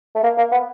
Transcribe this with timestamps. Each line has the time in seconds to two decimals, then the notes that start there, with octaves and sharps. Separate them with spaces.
0.15 A3
0.23 A#3
0.38 A#3
0.52 B3